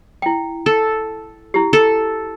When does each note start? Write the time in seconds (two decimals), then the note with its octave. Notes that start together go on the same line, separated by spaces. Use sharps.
0.22 E4 G5
0.66 A4
1.54 E4 G4
1.73 A4